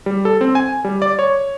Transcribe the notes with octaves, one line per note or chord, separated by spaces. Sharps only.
G3
A4
C4
G#5
G3
D5
C#5